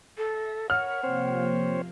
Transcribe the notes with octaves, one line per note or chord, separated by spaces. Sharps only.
A4 E5 A#6
A#4 C#5 F#5 B5 C#6 F6
C3 F3 A#3 C4 C5 C#5